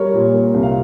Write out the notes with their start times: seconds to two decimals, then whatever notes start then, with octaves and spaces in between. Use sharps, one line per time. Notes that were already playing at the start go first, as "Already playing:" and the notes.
Already playing: G3 A#4 C#5
0.14 A#2
0.34 A#3
0.54 C2
0.63 F5